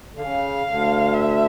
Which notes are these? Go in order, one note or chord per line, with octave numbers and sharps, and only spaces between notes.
D3
C#3 F5
D2 D3
E5